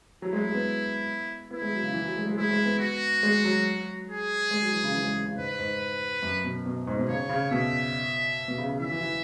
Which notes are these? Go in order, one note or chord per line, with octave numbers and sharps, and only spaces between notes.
F#3 E4
G#3
G#3
B3
B3 E4
G#3
F#3
C#3
E3
F#3
G#3
G#3
G#3 E4
G#3
B3
F#4
G#3
F#3
G#4
G#3
F#3
E3
C#3
E3
G#3
C#3
G#2 B4
G#2
F#2
B2
B2
G#2
B2
C#3 C#5
C#3
B2 E5
B2
C#3
C#3
E3 E5
E3
E3